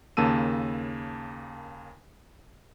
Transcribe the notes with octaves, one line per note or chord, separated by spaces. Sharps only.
D#2 C#3 A#3 A5 E6 D#7